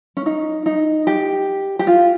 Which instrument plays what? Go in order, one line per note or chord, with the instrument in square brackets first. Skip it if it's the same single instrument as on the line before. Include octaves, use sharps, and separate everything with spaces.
[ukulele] C#4
D#4
D#4
G4
G4
F4